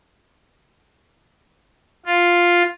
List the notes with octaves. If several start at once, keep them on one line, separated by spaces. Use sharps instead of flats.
F4